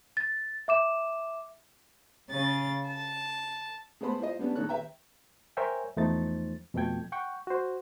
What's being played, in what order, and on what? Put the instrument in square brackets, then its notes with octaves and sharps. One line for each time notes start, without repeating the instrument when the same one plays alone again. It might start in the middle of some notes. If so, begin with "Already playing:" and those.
[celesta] A6
E5 D6 E7
[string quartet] C#3 A6
A5
[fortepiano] G#3 A3 B3 C5 B5 C6
E4 F4 C5 D#5
G3 B3 C#4 D4
A#1 D#3 A4 C#5 F#6
B4 E5 G5 A#5
[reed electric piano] A#4 C5 C#5 E5 G5 G#5
E2 F3 A3 D#4 C5 A6
F2 B2 A3 A4 G5 G#6
F#5 G5 C#6
F#4 C5